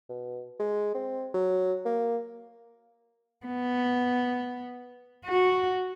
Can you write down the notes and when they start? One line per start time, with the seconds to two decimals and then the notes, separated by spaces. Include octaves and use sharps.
0.09 B2
0.59 G#3
0.95 C4
1.34 F#3
1.85 A#3
3.46 B3
5.25 F#4